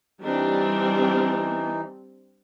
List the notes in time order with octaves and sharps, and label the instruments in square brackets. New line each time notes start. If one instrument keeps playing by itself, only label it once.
[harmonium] E3 D#4 [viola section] G3 C4 D4